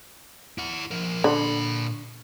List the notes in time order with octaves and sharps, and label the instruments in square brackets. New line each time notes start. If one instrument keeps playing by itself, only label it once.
[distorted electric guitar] E4 F#5
F3 A#4
[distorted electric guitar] A#2 B5 [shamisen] D3